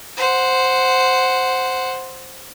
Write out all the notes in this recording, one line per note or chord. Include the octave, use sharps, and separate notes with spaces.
C5 F#5